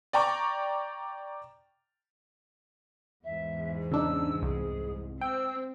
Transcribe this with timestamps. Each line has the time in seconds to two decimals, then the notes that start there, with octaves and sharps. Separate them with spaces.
0.13 D5 G5 A#5 C#6 D6
3.24 E2 G#2 E5
3.91 C#3 D4 D#4 E6
4.42 C2 G#4
5.21 C4 G5 E6